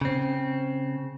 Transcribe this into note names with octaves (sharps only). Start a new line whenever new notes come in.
C#3 C4